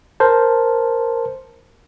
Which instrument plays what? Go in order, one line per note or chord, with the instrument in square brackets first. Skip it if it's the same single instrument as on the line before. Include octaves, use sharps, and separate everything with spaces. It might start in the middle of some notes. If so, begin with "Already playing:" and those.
[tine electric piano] A#4 C5 A5